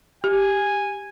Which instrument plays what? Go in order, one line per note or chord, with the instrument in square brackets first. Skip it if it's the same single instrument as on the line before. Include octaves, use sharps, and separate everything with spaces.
[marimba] G4 [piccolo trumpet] G#5